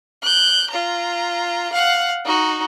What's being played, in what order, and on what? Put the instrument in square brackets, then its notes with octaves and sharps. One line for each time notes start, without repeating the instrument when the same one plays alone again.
[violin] F#6 G6
F4 A#5
F5 F#5
D#4 F#4